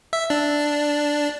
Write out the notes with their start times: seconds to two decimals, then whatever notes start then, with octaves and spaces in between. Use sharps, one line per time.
0.13 E5
0.30 D4